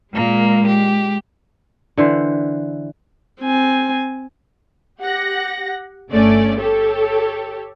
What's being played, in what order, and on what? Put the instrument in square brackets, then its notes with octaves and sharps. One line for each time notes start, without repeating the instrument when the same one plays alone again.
[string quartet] A#2 A#3 [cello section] G#3
[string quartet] G4
[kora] D3 E3 C5
[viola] C4 G#5
[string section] G4 F#5 A#6
G1 A3 C#4 D5
G4 A4 C#5